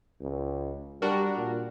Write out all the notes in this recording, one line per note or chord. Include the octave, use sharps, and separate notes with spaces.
C#2
G3 D4 F#4 A#4
A#2